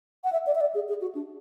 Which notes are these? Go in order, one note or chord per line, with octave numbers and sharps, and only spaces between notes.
F#5
E5
D5
E5
D5
G#4
G#4
F#4
D4